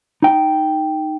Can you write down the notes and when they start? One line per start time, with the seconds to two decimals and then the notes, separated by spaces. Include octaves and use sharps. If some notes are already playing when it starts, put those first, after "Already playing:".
0.22 D#4 G5